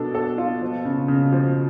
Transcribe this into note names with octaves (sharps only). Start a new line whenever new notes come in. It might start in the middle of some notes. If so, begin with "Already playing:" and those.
Already playing: B2 D4 A4
A4
F4
F3
C#3
C#3
F3